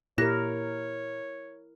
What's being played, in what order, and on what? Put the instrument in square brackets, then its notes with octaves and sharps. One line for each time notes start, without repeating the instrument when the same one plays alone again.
[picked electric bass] A#2 [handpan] E4 A#4 [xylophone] G4 F#6 A#6 [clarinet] C#5